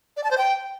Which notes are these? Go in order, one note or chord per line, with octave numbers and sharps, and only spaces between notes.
D5
A5
C5
G5